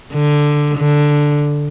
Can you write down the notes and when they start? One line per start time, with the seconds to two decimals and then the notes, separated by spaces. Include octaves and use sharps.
0.14 D3
0.78 D3